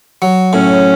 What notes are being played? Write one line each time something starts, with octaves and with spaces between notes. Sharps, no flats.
F#3
A2 C#4